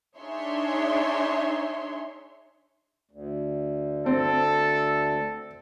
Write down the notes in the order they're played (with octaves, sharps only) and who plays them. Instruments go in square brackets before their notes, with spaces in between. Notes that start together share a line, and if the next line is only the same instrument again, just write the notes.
[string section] D4 D#4 G#4 C#5 E5 C6
[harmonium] D2
[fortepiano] C4 [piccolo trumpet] A4